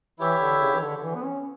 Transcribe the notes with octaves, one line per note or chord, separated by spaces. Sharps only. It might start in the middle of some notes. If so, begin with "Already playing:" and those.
E3 E4 G4 C#5 E5
D3
C#3
E3
D3
D3
E3
B3
C#4